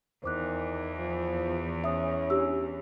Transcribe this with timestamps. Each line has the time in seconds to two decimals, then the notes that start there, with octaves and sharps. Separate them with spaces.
0.24 E2 D#3 C5 D6 F#6
0.98 F3
1.84 C#4 E5 D#6
2.30 D4 G4 E6